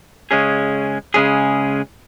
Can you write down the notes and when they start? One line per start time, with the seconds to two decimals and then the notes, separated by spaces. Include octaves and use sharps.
0.31 C#3 G#3 C#4 G#4
1.14 C#3 G#3 C#4 G#4